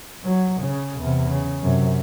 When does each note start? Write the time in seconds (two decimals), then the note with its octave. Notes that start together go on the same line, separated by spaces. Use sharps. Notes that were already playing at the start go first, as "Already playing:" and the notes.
0.24 F#3
0.61 C#3
1.00 E2 C3
1.30 C#3
1.62 F#2 C3